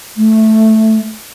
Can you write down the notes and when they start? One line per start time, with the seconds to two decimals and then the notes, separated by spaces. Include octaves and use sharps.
0.17 A3